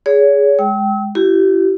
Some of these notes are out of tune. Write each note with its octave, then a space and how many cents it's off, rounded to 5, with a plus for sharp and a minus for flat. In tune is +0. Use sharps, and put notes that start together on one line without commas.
G#4 +0 C#5 +35
G#3 +0 G5 -20 E6 -40
E4 +30 G4 -35